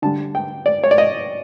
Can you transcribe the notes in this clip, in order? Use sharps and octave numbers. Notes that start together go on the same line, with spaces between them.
D3 G3 A5
G5
D5
C#5
D5
D#5